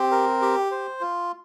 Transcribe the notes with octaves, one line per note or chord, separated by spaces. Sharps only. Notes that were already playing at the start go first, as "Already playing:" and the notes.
Already playing: C4 G4
A#4
G4
C5
F4